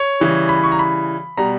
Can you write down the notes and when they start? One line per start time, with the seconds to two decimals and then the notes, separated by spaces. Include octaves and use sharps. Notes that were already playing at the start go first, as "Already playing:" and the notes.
Already playing: C#5
0.20 C#3 E3 G3
0.49 B5
0.64 C#6
0.72 A#5
0.79 B5
1.37 B2 G3 A#5